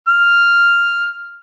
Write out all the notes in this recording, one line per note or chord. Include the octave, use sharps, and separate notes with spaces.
F6